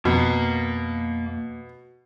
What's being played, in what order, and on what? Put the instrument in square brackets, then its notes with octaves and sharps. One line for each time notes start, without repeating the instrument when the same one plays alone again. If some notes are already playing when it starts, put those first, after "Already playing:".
[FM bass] F2 [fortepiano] B2 [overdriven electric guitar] A#3 A#5